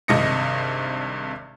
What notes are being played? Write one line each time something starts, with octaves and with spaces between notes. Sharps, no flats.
G#1 G2 C3 D#5 A#6 C#7